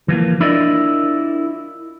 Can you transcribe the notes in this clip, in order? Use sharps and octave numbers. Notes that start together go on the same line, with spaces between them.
E3 F3 A#3
D4 E4 F4 A#4 D5 D#5